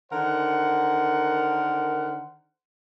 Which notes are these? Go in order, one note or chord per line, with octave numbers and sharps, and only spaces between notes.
D3 D#3 A#4 C5 F#5